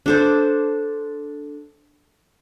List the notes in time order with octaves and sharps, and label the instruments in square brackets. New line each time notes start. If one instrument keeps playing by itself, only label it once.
[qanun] D4 A4 C5